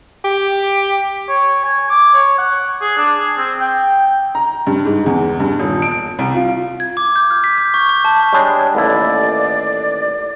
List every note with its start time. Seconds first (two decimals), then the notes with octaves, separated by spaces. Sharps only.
0.24 G4
1.29 C#5
1.64 G#5
1.90 D6
2.14 C#5
2.38 F#5
2.81 G#4
2.97 D4
3.18 G#4
3.38 C4
3.61 G5
4.35 A#5
4.67 G2
4.85 G#2
5.06 E2
5.40 G2
5.60 D#1
5.82 D7
6.19 C2
6.35 F4
6.80 G#6
6.97 D6
7.16 G6
7.31 F6
7.44 B6
7.58 G6
7.74 C#6
7.89 C#6
8.05 A5
8.33 G3 G#3 D4 C#5
8.75 A1 D#2 E4 D5